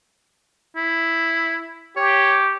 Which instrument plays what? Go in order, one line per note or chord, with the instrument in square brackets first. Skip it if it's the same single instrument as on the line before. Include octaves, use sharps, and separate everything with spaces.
[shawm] E4
[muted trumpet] G4 [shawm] C#5